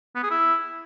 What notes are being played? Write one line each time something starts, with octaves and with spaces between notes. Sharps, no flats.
B3
G#4
E4